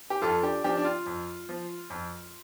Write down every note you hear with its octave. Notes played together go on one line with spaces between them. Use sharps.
G4
F2 F4 A4
D4 G4
F3 D4 G4
D4
F4
F2
F3
F2